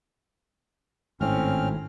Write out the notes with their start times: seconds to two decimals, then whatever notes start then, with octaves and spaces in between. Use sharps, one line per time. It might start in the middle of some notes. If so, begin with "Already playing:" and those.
1.21 G#1 A2 C4 C#4 F6